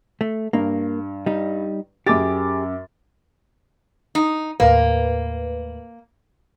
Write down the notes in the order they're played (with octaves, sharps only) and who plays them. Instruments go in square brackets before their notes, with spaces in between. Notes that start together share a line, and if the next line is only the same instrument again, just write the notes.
[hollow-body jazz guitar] A3
[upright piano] G2 [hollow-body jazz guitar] A#3
[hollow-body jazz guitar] G3 D#4
[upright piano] F#2 D6 A6 [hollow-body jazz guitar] G4 G#4
[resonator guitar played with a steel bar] D#4
[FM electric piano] D#2 A2 B4 [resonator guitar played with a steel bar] A#3